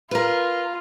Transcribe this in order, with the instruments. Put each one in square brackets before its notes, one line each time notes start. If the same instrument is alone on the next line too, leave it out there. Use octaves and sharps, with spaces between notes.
[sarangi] F4 [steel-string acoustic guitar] A#4 B4